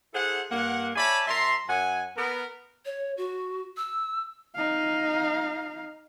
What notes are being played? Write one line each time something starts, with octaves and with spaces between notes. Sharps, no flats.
E4 G#4 A4 C5 F#5
G2 A#3 F#5
C#5 D5 E5 G#5 A5 B5
F#2 E5 A5 A#5 C6
F#2 F#5 G#5
B3 A#4
C#5
F#4
E6
D#4 F5